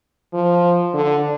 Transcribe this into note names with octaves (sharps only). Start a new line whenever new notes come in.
F3
D3